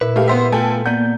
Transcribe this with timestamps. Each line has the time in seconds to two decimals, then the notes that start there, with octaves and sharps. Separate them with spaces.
0.01 A#2 E4 B4
0.16 A3 G4 F5
0.28 B3 C5 E5
0.52 A3 B3 F4 A4 G5 G#5
0.86 A#3 B3 D5 F#5 G6